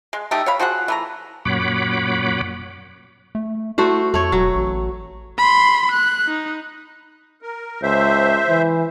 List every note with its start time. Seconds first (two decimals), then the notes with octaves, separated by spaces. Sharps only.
0.13 G#3
0.31 A3 D#4 G4
0.46 C#5 F5 B5
0.59 F3 F#4 G#4 F#5
0.88 E3 A3 A#5
1.45 F#2 A#2 C#5 F#5 B5 D6
3.35 A3
3.78 A3 E4 F#4 C5
4.14 F2 A3 C#5
4.32 E1 F#3
4.55 A1
5.38 B5 C6
5.91 F#6
6.27 D#4
7.42 A#4
7.82 C#2 C5 E5
8.49 E3